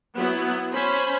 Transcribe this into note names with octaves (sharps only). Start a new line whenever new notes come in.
F#3 B3 E4
C#4 C5 B5